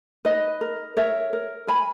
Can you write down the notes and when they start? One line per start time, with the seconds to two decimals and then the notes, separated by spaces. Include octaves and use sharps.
0.25 D#4 B4 D#5
0.61 A#4
0.97 A#4 C#5 E5
1.33 A#4
1.67 A#4 G#5 B5